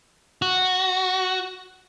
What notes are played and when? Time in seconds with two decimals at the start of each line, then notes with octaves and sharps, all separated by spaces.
0.42 F#4